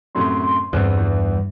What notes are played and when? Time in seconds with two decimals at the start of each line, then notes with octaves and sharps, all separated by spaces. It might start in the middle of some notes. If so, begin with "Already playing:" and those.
0.15 F#2 A2 C3 C6
0.73 E2 G2 B3 C4 G#4
0.98 E3